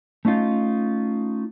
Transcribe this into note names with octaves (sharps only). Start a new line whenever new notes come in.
A3 C#4 D#4 F4